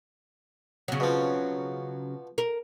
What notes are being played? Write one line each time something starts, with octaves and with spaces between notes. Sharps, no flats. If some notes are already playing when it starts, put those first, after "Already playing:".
C#3 F#3
B2 F3
A#4